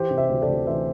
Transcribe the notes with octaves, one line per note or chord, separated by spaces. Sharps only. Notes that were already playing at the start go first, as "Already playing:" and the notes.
Already playing: E3 G4 C5
C3
C5 E5
D2
A4 D5
D2
E3 C5 E5